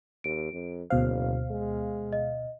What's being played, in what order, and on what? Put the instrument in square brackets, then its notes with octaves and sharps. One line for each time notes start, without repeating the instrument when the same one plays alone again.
[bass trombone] D#2 [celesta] D7
[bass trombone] F2
[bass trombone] F#1 [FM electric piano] D2 B2 F5 [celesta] C5
[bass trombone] G#3
[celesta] D#5